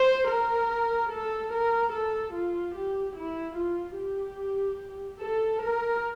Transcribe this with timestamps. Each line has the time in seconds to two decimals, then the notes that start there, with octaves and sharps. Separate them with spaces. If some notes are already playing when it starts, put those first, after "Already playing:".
Already playing: C5
0.30 A#4
1.11 A4
1.53 A#4
1.93 A4
2.34 F4
2.75 G4
3.16 E4
3.56 F4
3.97 G4
5.21 A4
5.62 A#4